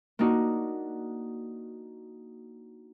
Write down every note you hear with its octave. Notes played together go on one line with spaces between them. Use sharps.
A#3 D4 D#4 F#4